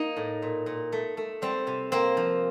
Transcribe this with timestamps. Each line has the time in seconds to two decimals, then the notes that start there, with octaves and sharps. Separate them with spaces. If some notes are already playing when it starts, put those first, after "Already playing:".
Already playing: A#3 D#4
0.17 A2
0.42 A#2
0.66 A#2
0.92 A3
1.17 A3
1.42 G3 C4
1.67 C3
1.92 A#3 C4
2.17 F3